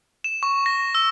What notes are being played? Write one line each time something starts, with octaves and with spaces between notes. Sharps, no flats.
E7
C#6
A#6
E6